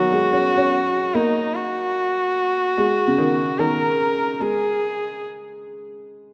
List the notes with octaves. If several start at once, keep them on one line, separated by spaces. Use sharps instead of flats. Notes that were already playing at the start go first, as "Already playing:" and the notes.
Already playing: D#3 F#3 F#4
G#3
C#4
C#4
A#3 D#4
F#4
G#3
C#3
D#3
D#3 A#4
G#3 G#4